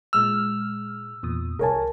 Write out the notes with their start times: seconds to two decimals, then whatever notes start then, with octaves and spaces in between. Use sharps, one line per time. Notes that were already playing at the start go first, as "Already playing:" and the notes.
0.13 A#2 G#3 E6 F6
1.23 E2 A#2 D#6
1.59 C2 A#4 C#5 G#5 A5